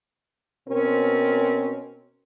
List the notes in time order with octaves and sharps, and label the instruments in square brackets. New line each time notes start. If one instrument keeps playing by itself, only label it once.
[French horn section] B2 C4 C#4 A#4 C5